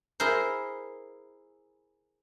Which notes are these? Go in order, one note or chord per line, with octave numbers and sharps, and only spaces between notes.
E4 G#4 A#4 C5